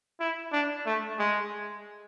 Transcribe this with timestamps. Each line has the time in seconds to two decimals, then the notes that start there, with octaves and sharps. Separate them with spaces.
0.20 E4
0.53 D4
0.86 A3
1.19 G#3